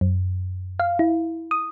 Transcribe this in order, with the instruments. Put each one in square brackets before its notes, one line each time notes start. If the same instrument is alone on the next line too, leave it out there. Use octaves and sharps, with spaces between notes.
[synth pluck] F#2
F5
E4
D#6